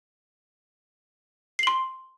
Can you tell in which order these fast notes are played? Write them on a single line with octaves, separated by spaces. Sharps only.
C7 F#7 C6